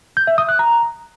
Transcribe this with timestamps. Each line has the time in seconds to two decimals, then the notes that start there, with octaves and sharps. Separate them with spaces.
0.17 G6
0.27 E5
0.38 D#6
0.49 F#6
0.59 A#5